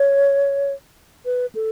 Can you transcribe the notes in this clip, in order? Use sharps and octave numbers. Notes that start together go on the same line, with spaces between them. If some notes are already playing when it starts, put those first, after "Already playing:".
Already playing: C#5
B4
A4